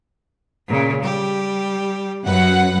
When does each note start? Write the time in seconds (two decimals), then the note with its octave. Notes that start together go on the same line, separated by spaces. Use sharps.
0.67 A#2 C#3
1.02 G3 G4
2.26 F#2 B4 F#5